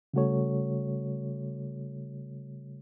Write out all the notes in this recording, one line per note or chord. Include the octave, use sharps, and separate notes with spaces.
C#3 G3 A3 F#4 A4 C#5